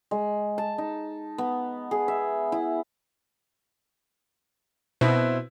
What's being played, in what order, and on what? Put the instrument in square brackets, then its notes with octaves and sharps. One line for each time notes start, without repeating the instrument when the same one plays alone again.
[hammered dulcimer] G#3
A5
D#4
B3
G#4
E5
E4
[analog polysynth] B2 [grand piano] C4 E4 B4